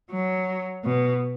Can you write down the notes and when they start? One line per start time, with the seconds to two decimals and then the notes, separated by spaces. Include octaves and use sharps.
0.11 F#3
0.84 B2